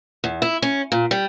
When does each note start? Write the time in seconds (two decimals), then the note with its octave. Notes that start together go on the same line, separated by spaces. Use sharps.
0.24 E2
0.42 E4
0.62 C#4
0.92 A#2
1.11 G3